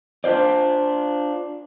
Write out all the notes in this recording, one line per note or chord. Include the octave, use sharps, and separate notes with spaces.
D4 F4 C5 D5